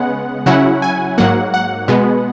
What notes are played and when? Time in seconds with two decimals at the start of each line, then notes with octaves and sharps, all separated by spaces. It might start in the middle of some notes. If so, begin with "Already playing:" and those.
Already playing: C#3 G#3 B3 F#5
0.46 C#3 F#3 C#4 E4 F#5
0.82 G#5
1.18 G#2 F#3 A#3 F#5
1.54 F#5
1.88 B2 G#3 B3